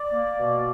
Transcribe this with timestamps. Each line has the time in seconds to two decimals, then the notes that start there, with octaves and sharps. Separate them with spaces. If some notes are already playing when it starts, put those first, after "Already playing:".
Already playing: D5
0.13 A#3
0.38 B2